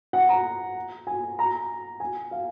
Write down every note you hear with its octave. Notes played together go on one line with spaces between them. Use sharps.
F#5
A#5
G#5
A#5
G#5
F5